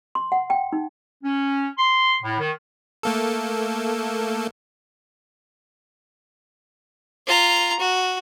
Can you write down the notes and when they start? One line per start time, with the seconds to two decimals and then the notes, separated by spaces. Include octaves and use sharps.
0.15 C6
0.32 F#5
0.50 G5
0.73 D#4
1.23 C#4
1.78 C6
2.22 A2
2.38 D#3
3.03 A3 A#3 A4
7.27 F4 A#5
7.79 F#4